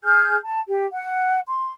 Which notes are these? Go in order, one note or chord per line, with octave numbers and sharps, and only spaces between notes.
G#4 G#5 F6 G6
A5
G4
F#5
C6